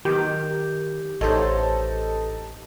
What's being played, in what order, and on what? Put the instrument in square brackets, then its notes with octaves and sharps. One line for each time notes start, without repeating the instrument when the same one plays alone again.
[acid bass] D#3 [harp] G4
[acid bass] A1 [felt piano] D#4 A4 D#5 [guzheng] F#4 C5 C#5